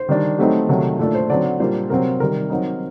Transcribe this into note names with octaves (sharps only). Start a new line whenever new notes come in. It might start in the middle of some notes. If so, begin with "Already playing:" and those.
Already playing: C5
D#3 G3 D4
F#3 A3 C4 D#4 G4
C3 D#3 F#3 A3
A#2 A3 D4 A4
C5
D3 F#3 C4 D5
A#2 G3 A#3 D4 C5
C3 F#3 C4 A#4
C3 D#3 G3 A#4
F#3 C4 D#4